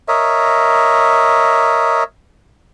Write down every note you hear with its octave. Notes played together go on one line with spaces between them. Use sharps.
A#4 C#5 D#5 E5